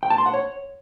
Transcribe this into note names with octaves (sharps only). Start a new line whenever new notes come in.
G5
A5
C6
F#5
C#5